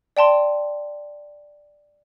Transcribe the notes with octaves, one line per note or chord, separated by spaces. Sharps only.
D5 G5 A5 C6